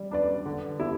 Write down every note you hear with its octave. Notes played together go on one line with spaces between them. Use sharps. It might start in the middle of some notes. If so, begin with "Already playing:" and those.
Already playing: G3
D4 B4 D5
D3
E4